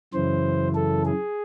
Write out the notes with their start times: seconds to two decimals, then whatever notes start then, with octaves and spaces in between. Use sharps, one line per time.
0.13 F#2 C#3 E3 C5
0.75 A4
1.05 G#4